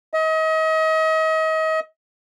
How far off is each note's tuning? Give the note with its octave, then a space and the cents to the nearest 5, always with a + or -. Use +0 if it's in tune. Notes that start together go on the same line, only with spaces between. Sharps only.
D#5 +35